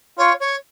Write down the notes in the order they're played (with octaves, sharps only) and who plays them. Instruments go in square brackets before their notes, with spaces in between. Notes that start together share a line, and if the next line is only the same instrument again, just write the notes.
[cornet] F4 [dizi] C#5
[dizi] C#5